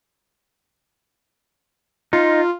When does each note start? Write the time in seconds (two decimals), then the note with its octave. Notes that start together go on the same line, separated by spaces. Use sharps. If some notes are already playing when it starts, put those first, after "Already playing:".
2.13 D#4 F4